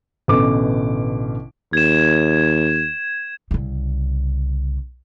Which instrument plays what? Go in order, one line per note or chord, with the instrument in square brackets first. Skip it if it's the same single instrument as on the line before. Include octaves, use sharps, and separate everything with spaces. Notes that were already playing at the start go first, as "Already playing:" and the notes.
[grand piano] A1 B2 D3 D6
[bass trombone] D#2 [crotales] G#6 E7
[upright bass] C2 C#3